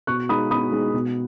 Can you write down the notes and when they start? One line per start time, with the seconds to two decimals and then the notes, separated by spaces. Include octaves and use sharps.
0.07 B2 C#6 F#6
0.29 G#3 D#4 B5 D#6
0.51 B2 B5 D#6
0.72 G#3 D#4
0.94 B2